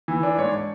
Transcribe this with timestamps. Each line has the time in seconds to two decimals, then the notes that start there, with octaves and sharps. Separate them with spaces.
0.08 E3
0.23 D4
0.38 G#2 C#5